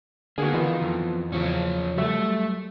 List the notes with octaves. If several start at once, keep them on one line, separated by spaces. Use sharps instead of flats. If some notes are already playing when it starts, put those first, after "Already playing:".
D3 A#3 B3 F#4 G#4
D#3 E3 B3 F4
F2
E2 C#3 F3 F#3 C#4
F#3 G3 A3 E5